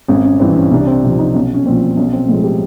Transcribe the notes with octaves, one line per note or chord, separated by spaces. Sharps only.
G#1 C#4
C#4
G2 E3 C4
C#4
C2 D4
C4
C3 F3
D#4
B1 C#4
C#4
A#2 F3 C4
B1 C#4
C4
A2 F3 G#3
G4